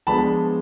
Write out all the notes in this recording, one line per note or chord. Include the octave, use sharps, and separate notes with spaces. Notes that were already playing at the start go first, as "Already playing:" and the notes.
F3 G#3 B3 D4 A5 B5